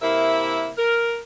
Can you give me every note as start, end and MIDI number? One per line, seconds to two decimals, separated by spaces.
0.01 0.69 48
0.01 0.69 58
0.01 0.69 64
0.01 0.69 70
0.01 0.69 76
0.77 1.17 70